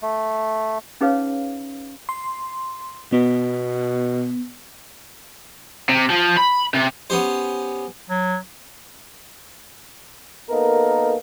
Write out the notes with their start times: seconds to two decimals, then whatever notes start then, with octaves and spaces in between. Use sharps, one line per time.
0.02 A3
1.01 C#4 D#4 G#4 B4 C#5 F5
2.09 C6
3.12 B2 B3
5.89 C3
6.10 F3
6.37 B5
6.74 C3
7.10 B3 C#4 G4 C5
8.10 F#3
10.50 A#3 B3 D#4 A4 A#4